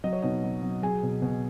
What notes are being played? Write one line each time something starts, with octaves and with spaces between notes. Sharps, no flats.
F#3 D#5
C#5
B2 D#4 D#5
F#3
F#3
F#3 G#4 G#5
B2
B2